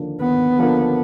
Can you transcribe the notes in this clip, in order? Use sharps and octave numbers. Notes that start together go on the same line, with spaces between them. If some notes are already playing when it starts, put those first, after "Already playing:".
Already playing: D#2 D3 F3 A#3 D4
D#2 B3
D3 F3 A#3 D4